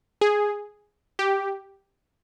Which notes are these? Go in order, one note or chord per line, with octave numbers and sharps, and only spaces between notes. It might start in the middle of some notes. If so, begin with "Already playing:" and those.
G#4
G4